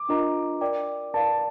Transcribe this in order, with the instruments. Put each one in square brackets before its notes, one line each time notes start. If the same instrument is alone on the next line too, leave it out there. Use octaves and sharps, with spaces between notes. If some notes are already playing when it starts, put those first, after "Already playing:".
Already playing: [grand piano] D6
[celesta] D4 F4 A#4 D#5 A#5
A#4 D5 G5 D6
[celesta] A#4 D5 F5 [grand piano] A5